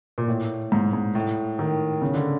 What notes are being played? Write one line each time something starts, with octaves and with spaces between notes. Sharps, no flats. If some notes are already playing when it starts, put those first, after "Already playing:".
A#2
A2
G#2
G#2
A2
D#3
C#3
D3